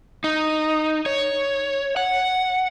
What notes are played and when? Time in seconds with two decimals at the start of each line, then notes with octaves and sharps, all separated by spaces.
0.24 D#4
1.06 C#5
1.97 F#5